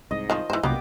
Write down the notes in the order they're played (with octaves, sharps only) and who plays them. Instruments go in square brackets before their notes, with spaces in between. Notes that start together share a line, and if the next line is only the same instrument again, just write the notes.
[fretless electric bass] C2 G#2 [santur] D#5
[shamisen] D#3 F3
[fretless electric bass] G#2 [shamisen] E3 C5
[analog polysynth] C2 [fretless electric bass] F#2 A#2 [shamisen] A#3 [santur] B3 G4 D6